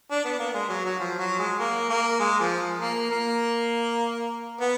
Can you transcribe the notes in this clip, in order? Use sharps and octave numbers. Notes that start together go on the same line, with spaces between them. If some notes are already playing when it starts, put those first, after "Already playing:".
D4
B3
A#3
G#3
F#3
F#3
F3
F#3
G#3
A#3
A#3
G#3
F3
A#3
A#3
B3